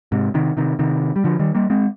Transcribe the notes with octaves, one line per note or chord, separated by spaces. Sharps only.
G#2 C3
C3 D#3
C3 D#3
C3 D#3
G3
D3 F3
D#3 G3
G3 A#3
G#3 C4